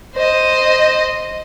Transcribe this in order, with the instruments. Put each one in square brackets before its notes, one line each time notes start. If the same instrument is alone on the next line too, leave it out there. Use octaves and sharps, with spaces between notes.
[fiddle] C5 D#5